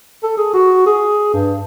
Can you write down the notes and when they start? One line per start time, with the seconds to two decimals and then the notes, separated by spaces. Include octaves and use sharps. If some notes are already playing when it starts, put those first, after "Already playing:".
0.23 A4
0.38 G#4
0.54 F#4
0.86 G#4
1.34 G2